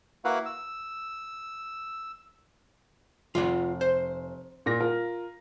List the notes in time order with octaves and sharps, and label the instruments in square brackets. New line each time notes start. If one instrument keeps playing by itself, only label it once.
[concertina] A#3 E4 F#4 B4 F5 F#5
E6
[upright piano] F1 [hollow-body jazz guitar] F4 D5 F#5
[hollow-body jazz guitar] C5
[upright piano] A#2 A#6
F4 A#4